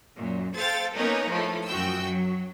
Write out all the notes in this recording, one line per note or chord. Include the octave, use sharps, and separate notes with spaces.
F#2 A#2
A4 C5 F5 G5 A6
A#3 B3 C#4 D#4 A#4 B4
A2 F3 A3
F#2 F3 F#4 G5 E6
F#3